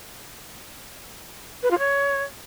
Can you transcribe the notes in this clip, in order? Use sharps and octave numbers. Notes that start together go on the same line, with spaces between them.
B4
F4
C#5